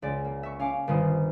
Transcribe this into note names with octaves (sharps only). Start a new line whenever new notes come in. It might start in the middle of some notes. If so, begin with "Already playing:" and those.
C#2 D5
A#3
E5 C#6
C#4 F5 D6
G1 D#3 G3 F4 C5 D#6